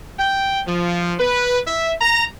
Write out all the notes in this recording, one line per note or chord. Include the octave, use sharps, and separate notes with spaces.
G5
F3
B4
E5
A#5